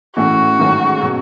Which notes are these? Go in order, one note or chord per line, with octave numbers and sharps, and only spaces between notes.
A2 E3 A3 C#4 F#4
G#2 D#3 F#3 A3 C#4
B2 F#3 C#4